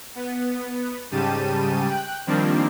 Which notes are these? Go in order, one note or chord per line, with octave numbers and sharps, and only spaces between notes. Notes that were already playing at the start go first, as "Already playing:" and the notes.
B3
G#2 C#3 G3 G4 A5 D#7
G5 F#6
D#3 F3 G3 A#3 C4 D4